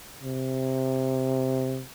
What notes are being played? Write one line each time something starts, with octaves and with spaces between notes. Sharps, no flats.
C3